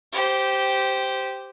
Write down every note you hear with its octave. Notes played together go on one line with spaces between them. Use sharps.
G4 C5